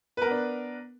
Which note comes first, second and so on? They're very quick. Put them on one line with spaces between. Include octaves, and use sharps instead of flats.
B4 A#4 B3 D4